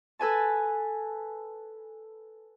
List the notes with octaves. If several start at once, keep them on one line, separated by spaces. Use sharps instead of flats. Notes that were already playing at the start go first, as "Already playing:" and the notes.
A4 B4 G#5 A5